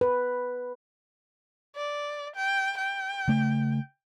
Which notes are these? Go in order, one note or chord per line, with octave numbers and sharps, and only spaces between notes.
B4
D5
G5
G5
C#3 A3